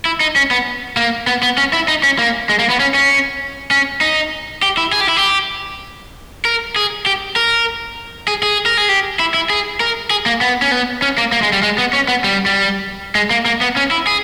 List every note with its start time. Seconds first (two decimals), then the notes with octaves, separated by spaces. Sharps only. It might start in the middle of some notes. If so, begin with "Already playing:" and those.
0.05 E4
0.20 D#4
0.36 C#4
0.51 B3
0.97 A#3
1.27 B3
1.43 B3
1.58 C#4
1.73 E4
1.88 D#4
2.04 C#4
2.18 A#3
2.49 G#3
2.59 A#3
2.70 B3
2.80 C#4
2.94 C#4
3.71 C#4
4.01 D#4
4.63 G4
4.77 E4
4.92 G#4
5.01 G4
5.09 E4
5.17 G4
6.45 A#4
6.76 G#4
7.06 G4
7.36 A#4
8.28 G#4
8.43 G#4
8.66 A#4
8.77 G#4
8.89 G4
9.19 E4
9.34 E4
9.50 G#4
9.80 A#4
10.11 G#4
10.26 A#3
10.41 B3
10.62 C#4
10.71 B3
11.02 C#4
11.18 A#3
11.32 A#3
11.43 G#3
11.53 G3
11.63 G#3
11.78 B3
11.93 C#4
12.08 B3
12.24 G3
12.46 G3
13.15 G#3
13.30 A#3
13.46 A#3
13.61 B3
13.76 C#4
13.91 E4
14.07 G#4